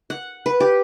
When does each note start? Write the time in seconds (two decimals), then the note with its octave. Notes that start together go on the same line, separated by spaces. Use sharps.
0.10 F#5
0.46 B4
0.60 G4